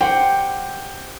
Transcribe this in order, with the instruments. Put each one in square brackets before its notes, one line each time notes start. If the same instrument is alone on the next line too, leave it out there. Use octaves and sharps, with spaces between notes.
[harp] G4 C5 F#5 [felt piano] G5